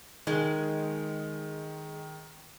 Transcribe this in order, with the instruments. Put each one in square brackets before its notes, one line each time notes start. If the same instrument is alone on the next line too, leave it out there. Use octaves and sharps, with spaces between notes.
[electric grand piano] D#3 [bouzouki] G#3